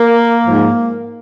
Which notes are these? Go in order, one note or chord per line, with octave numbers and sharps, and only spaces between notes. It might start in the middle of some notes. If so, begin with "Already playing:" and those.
Already playing: A#3
G#2 F3